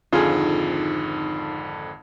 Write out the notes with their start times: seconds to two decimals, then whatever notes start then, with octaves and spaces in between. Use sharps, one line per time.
0.13 G#1 F2 D3 D#4 F4 G#4